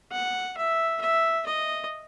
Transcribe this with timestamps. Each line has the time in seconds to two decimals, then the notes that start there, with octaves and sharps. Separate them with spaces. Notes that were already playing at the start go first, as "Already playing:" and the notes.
0.12 F#5
0.57 E5
1.01 E5
1.46 D#5